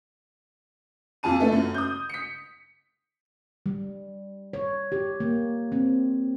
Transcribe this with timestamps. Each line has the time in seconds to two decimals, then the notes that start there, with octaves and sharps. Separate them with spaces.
1.23 F2 F4 G#4 A5 D#7
1.40 A3 B3 D4 E4 A4
1.52 F#2
1.75 D#6 G6
2.10 B6 C#7
3.66 G3
4.53 C#5
4.92 G4
5.20 A#3
5.72 C4